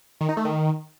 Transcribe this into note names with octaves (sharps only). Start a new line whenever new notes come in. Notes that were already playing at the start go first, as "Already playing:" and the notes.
D#3
D#4
A3
D#3